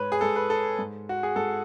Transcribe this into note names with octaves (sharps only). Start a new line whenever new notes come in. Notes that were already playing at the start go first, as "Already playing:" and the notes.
Already playing: G#2 B4 C#5
G#4
G#2 A4
B4
A4
G#2
F#4
G#4
G#2 A4